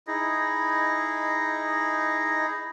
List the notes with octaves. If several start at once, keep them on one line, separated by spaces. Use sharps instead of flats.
D#4 E4 G#4 D#5